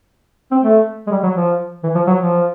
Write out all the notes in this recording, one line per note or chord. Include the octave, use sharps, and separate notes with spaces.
C4
A3
G#3
G3
F#3
F3
E3
F3
F#3
F3